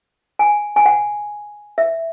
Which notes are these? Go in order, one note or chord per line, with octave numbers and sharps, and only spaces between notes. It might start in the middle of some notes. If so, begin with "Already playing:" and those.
G#5
G#5
F#5
E5